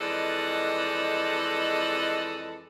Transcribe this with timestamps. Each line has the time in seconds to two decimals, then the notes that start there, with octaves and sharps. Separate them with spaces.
0.01 F2 E3 G#3 A4 D5 D#5